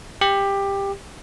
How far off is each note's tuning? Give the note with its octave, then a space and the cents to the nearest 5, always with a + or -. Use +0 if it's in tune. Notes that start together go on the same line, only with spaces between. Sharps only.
G4 +15